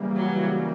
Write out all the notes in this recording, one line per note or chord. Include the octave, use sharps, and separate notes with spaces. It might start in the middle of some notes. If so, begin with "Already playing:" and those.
Already playing: C#3 E3 G3 A#3
F#3